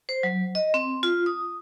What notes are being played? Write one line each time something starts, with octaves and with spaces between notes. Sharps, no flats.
C5
F#3
D#5
C4
F4
D#6